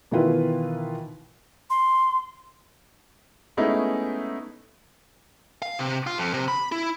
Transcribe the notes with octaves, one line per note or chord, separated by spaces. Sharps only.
B2 D#3 E3 E4 F4 B4
C6
G#3 A3 B3 C#4 D#4 E4
F5
C3
F4
F2
C3
B5
E4